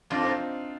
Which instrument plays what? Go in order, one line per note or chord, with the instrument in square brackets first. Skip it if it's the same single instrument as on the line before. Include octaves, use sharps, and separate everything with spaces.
[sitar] F2 [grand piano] D4 F4
[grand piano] C4 D#4